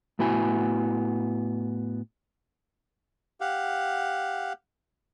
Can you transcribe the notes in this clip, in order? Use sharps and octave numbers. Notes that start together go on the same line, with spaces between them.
A2 B3 E4 F#4 G#5
G4 F5 F#5